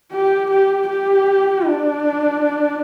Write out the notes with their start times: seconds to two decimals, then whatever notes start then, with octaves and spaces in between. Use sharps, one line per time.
0.12 G4
0.50 G4
0.88 G4
1.65 D4